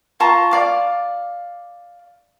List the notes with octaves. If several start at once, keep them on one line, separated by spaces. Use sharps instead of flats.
F4 A5 A#5 C#6
D5 F5 D6